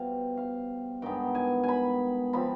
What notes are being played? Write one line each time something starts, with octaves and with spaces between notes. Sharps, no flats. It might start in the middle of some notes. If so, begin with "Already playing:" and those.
Already playing: B2 G3 C4 F5
F5
G2 D#3 G#3 B3 G5
G#5
G#5 B5
F3 C4 B5